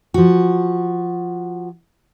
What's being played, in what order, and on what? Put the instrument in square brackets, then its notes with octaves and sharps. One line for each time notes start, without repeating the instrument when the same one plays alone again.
[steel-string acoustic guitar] F3 F#4